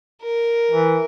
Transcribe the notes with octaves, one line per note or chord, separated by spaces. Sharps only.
A#4
E3